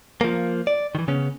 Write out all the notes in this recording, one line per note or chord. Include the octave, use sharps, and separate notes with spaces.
F3 A#3
D5
D#3 E3
C#3 B3 C#4